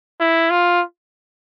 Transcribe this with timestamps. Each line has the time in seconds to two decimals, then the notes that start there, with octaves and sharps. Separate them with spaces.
0.21 E4
0.50 F4